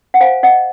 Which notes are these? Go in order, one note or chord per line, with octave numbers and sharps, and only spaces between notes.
F#5
C5 F5 G#5
D#5 F#5